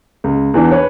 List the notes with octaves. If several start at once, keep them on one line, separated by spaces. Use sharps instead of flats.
C#2
E2 E3 D4
B4 C#5